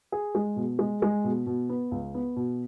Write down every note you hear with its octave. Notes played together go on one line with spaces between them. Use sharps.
G#4
G#3
B2
G#3
G#3
B2
B2
B3
C#2
B3
B2